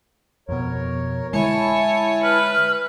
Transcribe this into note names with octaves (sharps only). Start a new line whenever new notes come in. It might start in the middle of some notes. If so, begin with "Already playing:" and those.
F2 B2 A#4 C#5
D3 G#3 E4 C#5 G#5 A5
B4 F6